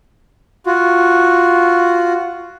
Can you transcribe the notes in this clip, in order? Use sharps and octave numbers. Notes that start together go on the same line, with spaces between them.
F4 F#4